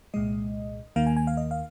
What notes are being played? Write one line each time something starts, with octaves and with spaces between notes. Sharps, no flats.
C2 A#2 G#3 D#5
D#2 D#3 A#3 F5
G#5
G#5
F5
D#5
F5